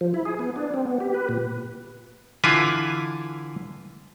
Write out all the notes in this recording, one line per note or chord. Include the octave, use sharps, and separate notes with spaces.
F3
E4
G#4
B3
D4
C4
B3
G4
B4
A#2
D3 E3 E4 F4 B4 G#5